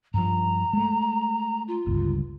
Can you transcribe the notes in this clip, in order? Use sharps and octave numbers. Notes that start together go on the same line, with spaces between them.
G2 F3 A#5
G#3 A3
F4
G1 C#2 G2